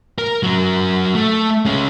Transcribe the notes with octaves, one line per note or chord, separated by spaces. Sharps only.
A#4
F#3 A#4
A3
G#3 C#4